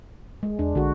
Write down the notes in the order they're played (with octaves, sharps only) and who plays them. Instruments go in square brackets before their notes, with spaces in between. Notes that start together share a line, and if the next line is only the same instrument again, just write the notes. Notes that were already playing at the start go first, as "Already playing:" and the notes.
[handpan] G#3
[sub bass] E2 [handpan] D4
[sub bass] A#1 [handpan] D3 F#4